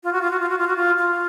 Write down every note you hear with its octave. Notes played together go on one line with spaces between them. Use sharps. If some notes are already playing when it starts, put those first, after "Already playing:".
F4
F#4
F4
F#4
F4
F#4
F4
F#4
F4
F4